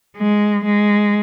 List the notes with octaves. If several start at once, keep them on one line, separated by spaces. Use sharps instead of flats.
G#3
G#3